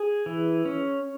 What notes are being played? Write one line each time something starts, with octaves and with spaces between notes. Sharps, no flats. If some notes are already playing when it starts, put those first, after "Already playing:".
Already playing: G#4
E3
C#4